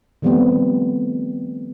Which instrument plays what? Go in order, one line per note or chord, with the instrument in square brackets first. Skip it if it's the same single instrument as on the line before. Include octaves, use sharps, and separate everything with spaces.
[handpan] D#3 F3 G3 A3 B3 C4